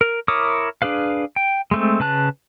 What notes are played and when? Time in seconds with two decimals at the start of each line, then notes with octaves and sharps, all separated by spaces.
0.01 A#4
0.28 E4 A#4 C#5 D6 D#6
0.82 D4 G#4 B4 F5
1.36 G5
1.71 G#3 A3 C4
2.00 C#3 B4 A5 F#6